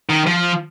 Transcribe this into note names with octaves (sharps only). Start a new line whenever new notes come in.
D#3
F3